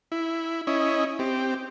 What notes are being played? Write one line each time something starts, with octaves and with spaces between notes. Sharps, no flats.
E4
C#4 E4 D#5
C4 G4